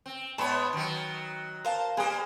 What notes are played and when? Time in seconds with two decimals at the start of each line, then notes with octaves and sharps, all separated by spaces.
0.06 C4
0.38 G#2 B3 C#5 A5 B5 C6
0.73 D#3 F#3
1.65 A#4 C5 F5 A5
1.97 G3 A#3 G#4 C5 D#6